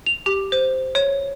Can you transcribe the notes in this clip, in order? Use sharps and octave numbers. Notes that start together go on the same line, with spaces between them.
F7
G4
C5
C#5